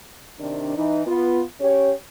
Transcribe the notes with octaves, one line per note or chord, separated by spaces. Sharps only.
C3 D#3 D4
E3 D#4
B3 F4
C#4 G4 C#5